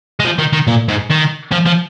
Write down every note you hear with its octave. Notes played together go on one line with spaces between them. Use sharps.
G#3
F3
D#3
D#3
A#2
G#2
D#3
F3
F3